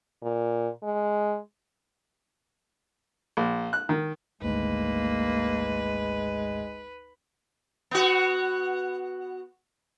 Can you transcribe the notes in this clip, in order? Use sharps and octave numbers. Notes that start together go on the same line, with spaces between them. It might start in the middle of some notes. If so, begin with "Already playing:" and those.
A#2
G#3
A#1
F#6
D#3
G#1 D2 G#3 A#3 B4
B3 F#4